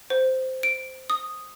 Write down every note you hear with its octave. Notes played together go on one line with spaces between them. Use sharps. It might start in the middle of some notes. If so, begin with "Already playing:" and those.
C5
D7
D#6